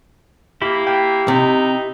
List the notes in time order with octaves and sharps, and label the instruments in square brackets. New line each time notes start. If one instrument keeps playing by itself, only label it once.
[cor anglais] A#3 [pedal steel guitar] E4 G4 B5
[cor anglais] A#3 [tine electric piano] G5
[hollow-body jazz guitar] C3 [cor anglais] D#4